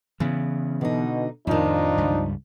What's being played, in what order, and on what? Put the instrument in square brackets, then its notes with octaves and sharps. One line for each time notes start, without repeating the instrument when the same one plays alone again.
[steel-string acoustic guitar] C#3 [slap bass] E3 B3
[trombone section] B2 [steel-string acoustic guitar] D3 D#4
[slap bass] F2 A2 [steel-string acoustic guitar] D#3 F4 [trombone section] F3 D4 D#4
[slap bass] C#2 G2 G3